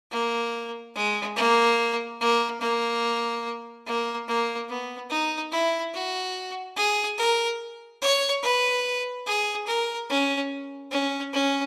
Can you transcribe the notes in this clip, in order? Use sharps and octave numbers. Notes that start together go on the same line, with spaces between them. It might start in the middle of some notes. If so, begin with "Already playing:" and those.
A#3
G#3
A#3
A#3
A#3
A#3
A#3
B3
D#4
E4
F#4
G#4
A#4
C#5
B4
G#4
A#4
C#4
C#4
C#4